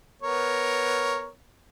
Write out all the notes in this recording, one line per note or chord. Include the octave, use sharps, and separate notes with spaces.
B3 A#4 C#5